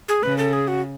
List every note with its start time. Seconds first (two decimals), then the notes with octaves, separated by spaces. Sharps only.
0.08 G#4
0.23 C#3 B4
0.38 A4
0.53 G#4
0.68 F#4